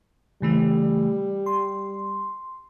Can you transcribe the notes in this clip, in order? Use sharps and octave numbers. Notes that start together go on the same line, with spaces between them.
C#3 E3 G3 A3
C6